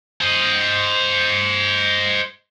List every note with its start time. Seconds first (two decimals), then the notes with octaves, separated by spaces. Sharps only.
0.21 C5 D#5